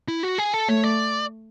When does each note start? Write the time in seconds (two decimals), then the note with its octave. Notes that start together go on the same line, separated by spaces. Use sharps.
0.08 E4
0.23 F#4
0.38 G#4
0.54 A4
0.69 A3 C#5
0.84 D5